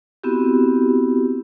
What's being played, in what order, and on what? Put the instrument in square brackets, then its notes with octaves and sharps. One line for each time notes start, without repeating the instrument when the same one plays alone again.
[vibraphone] B3 C4 E4 F#4 G4